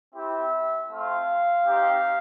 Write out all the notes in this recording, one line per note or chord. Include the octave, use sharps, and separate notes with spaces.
C4 E4 G4 E5
A3 C4 F4 F5
C4 D#4 G4